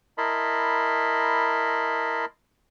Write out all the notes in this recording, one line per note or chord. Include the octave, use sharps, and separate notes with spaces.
E4 A#4 D#5 A5 B5 C6